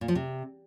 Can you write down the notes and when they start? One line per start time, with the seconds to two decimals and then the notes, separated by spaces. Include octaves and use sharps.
0.01 A#2
0.08 F3
0.15 C3